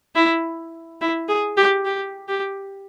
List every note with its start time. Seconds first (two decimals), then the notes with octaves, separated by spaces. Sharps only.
0.15 E4
1.01 E4
1.29 G#4
1.57 G4
1.85 G4
2.28 G4